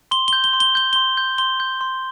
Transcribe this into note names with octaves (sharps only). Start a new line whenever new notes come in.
C6 G7
G7
G6
G7
C6
G7
G6 G7
C6 G7
G6
C6 G7
G6
C6